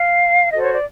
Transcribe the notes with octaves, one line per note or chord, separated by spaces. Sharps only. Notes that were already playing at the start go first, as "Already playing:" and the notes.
Already playing: F5
F#4 A4 C5 D#5
C#5
D5